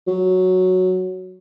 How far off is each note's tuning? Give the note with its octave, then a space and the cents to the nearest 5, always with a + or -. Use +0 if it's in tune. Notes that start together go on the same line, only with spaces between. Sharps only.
F#3 +0